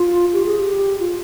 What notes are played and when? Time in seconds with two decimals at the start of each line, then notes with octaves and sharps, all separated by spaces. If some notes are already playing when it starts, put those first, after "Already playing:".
Already playing: F4
0.33 G4
0.46 G#4
0.59 G4
1.00 F4